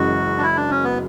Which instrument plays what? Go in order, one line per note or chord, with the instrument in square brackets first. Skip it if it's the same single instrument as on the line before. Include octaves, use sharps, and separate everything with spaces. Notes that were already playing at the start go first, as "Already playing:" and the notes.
Already playing: [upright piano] F#1 F#2 E3 G#3 [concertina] F#4
[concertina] D4
E4
D4
C#4
B3